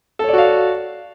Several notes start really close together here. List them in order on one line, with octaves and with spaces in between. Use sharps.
A4 C#5 D5 F#4 F5